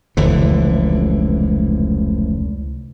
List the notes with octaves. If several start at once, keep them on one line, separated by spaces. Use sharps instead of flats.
F1 C#2 D3 E3